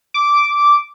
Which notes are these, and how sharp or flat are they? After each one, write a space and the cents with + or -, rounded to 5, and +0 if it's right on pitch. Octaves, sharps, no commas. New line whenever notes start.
D6 -10